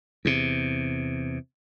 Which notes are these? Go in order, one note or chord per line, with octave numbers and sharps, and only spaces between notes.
E2 C3